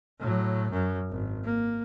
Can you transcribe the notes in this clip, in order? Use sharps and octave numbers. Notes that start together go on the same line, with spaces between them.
A2 F#3
F#2
G#1
A#3